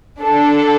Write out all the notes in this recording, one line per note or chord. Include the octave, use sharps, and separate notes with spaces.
D4 A4